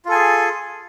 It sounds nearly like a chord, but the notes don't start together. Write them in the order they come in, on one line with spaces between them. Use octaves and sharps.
F4 A4 G#5 G#4